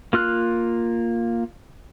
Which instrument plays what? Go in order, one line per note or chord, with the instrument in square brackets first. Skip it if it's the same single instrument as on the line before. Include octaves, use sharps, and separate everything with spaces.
[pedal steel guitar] A#3 F4 F6 F#6